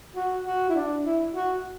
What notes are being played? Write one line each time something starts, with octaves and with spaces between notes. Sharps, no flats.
F#4
F#4
E4
D4
E4
F#4